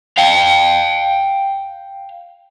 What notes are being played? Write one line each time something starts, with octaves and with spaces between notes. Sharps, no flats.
F5 G5